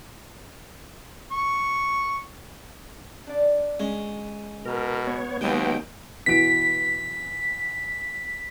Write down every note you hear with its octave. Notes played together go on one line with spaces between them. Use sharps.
C#6
D4 D5
G#3 C#4
B2 A#4
B3 C#5
D#2 B2 F#3 G#3 B3 G5
B2 E3 B6 D7